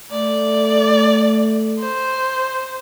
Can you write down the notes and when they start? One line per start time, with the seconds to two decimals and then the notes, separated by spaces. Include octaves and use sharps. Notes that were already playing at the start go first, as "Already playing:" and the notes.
0.11 A3 D5
1.80 C5